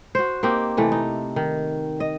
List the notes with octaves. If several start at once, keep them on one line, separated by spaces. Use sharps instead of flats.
F#4 C5
A#3 C4 D#4 G4
C3 E3 A3
D#4
D#3
D#5